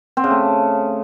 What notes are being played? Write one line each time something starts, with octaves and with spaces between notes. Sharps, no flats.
C4
C#3
A3